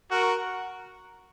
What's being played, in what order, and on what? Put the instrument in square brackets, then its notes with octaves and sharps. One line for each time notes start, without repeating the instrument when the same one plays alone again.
[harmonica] F#4 A#4